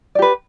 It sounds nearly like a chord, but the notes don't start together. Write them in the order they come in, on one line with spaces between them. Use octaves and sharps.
D5 G4 B4